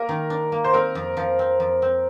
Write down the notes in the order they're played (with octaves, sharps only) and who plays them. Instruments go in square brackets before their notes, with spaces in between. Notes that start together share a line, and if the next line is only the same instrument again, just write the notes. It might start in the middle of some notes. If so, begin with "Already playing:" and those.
Already playing: [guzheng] A#3 [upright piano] A#4
[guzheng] D#3
D4
A#3
[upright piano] C5
[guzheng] C4 [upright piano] A#4
[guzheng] F2
F3
C4
F2
C4